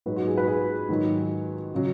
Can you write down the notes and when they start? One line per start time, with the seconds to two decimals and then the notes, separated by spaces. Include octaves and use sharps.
0.06 G#2 F#3 B4
0.16 F#4
0.27 G#4
0.37 B4
0.47 G#4
0.89 G#2 D#3 F#3
1.74 C#3 F#3